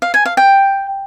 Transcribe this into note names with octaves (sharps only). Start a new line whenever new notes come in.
F5
G#5
F5
G5